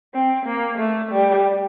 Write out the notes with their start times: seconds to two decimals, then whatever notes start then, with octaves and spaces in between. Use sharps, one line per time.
0.14 C4
0.46 A#3
0.78 A3
1.12 G3